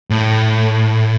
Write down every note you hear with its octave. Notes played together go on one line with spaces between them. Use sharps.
A2